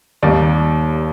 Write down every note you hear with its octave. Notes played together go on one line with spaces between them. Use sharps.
D#2 D#3 G3 A#3 D5